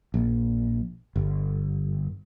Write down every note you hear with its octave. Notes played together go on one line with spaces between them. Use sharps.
A#1
G1